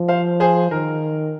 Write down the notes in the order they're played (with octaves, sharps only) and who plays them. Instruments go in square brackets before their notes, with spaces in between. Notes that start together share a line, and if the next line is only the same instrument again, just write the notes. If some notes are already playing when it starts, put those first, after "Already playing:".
Already playing: [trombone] F3
[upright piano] C5 F5
G#4 C5
[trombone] D#3 [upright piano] A#4